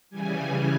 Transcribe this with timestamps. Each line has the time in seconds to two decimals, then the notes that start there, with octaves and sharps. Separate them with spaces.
0.10 C#3 E3 G3 G#5